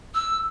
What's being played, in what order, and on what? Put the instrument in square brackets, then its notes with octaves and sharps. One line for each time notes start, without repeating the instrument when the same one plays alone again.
[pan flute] E6